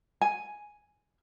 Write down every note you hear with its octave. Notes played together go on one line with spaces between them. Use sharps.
G#5